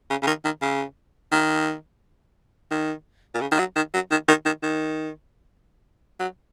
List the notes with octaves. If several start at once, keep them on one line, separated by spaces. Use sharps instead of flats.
C#3
C#3
D#3
D#3
C#3
D#3
D#3
A#2
C#3
D#3
F#3
D#3
F#3
D#3
D#3
D#3
D#3
F#3